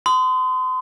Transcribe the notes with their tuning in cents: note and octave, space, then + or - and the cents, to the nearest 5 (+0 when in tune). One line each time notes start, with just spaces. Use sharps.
C6 -35 D#6 +0